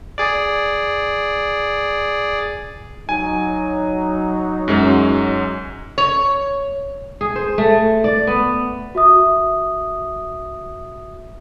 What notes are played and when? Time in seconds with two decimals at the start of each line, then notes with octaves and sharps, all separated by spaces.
0.18 G#4 D5
3.09 F#3 D#4 G#5
4.68 F#2 G#3 C#4
5.98 C#5
7.21 G#4
7.36 C5
7.58 A3
8.04 D5
8.27 B3
8.95 F#4 E5 D#6